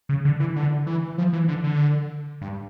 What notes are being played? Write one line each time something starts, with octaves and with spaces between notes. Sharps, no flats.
C#3
D3
E3
D3
E3
F3
E3
D3
D3
G2